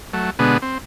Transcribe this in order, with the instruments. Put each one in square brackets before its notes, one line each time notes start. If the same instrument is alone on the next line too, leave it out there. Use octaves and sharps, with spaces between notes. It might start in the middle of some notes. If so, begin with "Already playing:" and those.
[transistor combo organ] F#3 A3
B2 D3 G#3 B3
C4